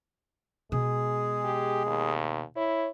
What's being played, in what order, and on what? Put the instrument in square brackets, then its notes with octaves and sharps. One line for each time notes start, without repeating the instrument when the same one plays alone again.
[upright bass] B2 [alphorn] G#3 [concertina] G#4
[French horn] G4
D#2
[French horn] E4 [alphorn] C#5